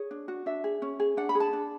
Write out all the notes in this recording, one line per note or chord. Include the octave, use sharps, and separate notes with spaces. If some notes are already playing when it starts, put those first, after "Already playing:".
Already playing: G#4 C#5
D4
F#4
D4 E5
G#4
C#4
G#4
D4 F#5
B5
G#4
A5
D4